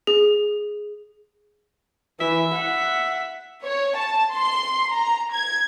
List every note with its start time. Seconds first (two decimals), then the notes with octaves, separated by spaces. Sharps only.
0.07 G#4
2.21 E3 E5
2.54 F#5
3.64 C#5
3.96 A5
4.31 C6
4.94 A#5
5.33 G#6